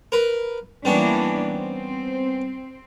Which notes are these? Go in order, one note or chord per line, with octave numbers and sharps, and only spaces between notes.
A#4 B4
E3 G3 A#3 B3 C#4 D4
C4